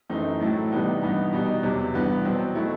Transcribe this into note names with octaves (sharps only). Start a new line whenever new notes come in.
F#2 E3 A3 C4 D#4
A2 F#3 A3 E4
C3 E3 G3 B3 D#4
G2 E3 B3 D#4
B2 G3 D#4
E2 C3 F#3
G2 E3 B3
B2 F#3 C4
B2 F#3 A3 E4